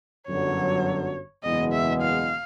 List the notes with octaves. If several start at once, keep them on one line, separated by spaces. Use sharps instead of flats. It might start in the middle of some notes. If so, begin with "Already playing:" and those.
G1 F#2 D3 F#3 C#5
F#1 E2 B2 G#3 B3 D#5
E5
F5